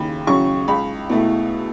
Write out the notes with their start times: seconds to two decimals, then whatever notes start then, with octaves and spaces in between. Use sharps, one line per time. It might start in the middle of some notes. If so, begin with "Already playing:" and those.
Already playing: D#2 C#3 B5
0.27 C#3 F#3 C#4 C#6
0.68 C#2 B5
1.09 B2 A3 E4